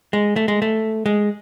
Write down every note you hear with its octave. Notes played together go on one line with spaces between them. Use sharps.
G#3
A3
G#3
A3
G#3